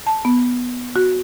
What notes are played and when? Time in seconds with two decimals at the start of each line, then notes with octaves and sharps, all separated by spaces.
0.07 A5
0.25 B3
0.96 F#4